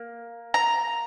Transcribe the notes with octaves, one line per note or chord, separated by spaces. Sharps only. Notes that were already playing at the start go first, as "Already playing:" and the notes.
Already playing: A#3
A#5